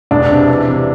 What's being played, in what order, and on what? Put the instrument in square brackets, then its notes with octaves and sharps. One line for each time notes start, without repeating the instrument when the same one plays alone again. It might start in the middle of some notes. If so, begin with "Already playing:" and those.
[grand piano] E1 [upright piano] D4
[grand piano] C3
E3
C3